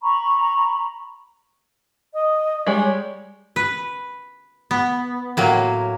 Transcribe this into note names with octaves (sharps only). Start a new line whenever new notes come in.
A#5 B5 C#6
D#5
G3 G#3 C#5
B4
B3
A2 F#3 A#3